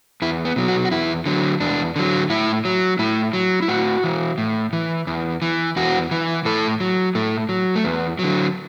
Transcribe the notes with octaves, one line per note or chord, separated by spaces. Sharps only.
E2 E4
B3
B2 F#3
F#4
F#4
E2 E4
D3 F#3
E2 D4
D3 F#3
A2 E4
F#3
A2 E4
F#3
E4
A2 F#4
E3
A2
E3
E2
E3
E2 F#4
E3
A2 A4
F#3
A2 A3
F#3
A3
E2 B3
D3 F#3